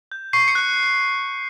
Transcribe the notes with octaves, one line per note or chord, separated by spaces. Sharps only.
G6
C#6 C7
C#7
F#6